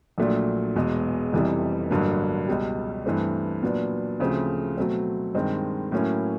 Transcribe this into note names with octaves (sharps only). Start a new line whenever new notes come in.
A#1 A#2 F#3 A3 D4
E1 E2 B2 G#3
F1 F2 C3 E3 G3
A1 G2 D3 F#3 A#3
C#2 B2 G3
G2 E3 A3 C4
A#2 F#3 B3 D4
D2 C#3 F3 A3 C4
B2 F#3 A3 C4
G2 D#3 G#3 C4
A2 F#3 A#3 C#4 E4